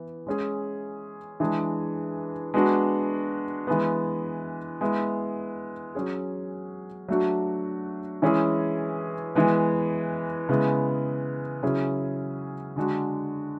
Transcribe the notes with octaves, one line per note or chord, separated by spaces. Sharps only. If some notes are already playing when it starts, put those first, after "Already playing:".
Already playing: E3 B3
G#3 C#4 G#4
E3 G#3 D4 G#4
G#3 B3 D4 F#4
E3 G#3 B3
G#3 B3 E4
F#3 C#4 G#4
F#3 A3 D4 F#4
E3 G#3 C#4 E4 G#4
E3 G#3 B3
C#3 G#3 B3 E4
C#3 F#3 C#4 E4 G#4
D3 G#3 D4 F#4